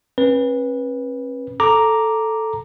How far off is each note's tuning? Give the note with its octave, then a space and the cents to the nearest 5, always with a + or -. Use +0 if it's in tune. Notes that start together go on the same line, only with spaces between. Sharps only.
C#4 -45 B4 -20
A4 +0 A#5 +0 D6 +0